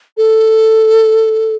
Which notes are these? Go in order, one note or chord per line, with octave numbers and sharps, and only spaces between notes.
A4